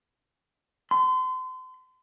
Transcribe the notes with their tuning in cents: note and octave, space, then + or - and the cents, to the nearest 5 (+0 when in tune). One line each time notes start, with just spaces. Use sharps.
C6 -35